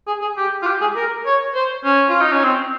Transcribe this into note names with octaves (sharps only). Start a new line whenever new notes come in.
G#4
G#4
G4
F4
G4
G#4
A#4
C#5
C5
C#4
F4
D#4
C#4
C4